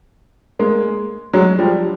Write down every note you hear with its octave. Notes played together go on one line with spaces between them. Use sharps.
G#3 A#3
F#3 G#3
F3 G3